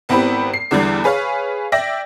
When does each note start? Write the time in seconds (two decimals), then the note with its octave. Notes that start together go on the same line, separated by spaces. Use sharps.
0.09 G#1 B3 C4 E4 G4 B5
0.54 C7
0.71 E2 D3 E3 G3
1.04 G#4 B4 C#5 F5
1.72 D5 E5 G5 A#6